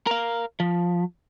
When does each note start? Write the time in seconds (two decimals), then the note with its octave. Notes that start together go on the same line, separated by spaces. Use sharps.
0.07 A#4 F5
0.60 F3